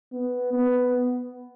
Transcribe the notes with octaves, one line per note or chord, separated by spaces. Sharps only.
B3
B3